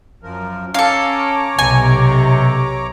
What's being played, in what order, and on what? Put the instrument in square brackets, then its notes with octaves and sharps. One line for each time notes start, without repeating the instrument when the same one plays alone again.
[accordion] F#2 F3 A#4
[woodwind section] C#4 [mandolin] A4 F5 [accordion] C#5 A#5 D6
[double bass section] B1 [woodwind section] C3 [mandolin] G#5